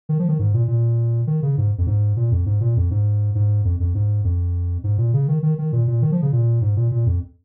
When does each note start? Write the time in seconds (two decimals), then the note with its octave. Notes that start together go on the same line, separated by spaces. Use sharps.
0.09 D#3
0.19 F3
0.29 D#3
0.39 G#2
0.54 A#2
0.68 A#2
1.27 D#3
1.42 C#3
1.58 G#2
1.78 F2
1.87 G#2
2.17 A#2
2.31 F2
2.46 G#2
2.61 A#2
2.77 F2
2.91 G#2
3.35 G#2
3.65 F2
3.80 F2
3.95 G#2
4.24 F2
4.84 G#2
4.98 A#2
5.13 C#3
5.28 D#3
5.43 D#3
5.58 D#3
5.73 A#2
5.87 A#2
6.02 D#3
6.12 F3
6.22 C#3
6.32 A#2
6.61 G#2
6.77 A#2
6.91 A#2
7.06 F2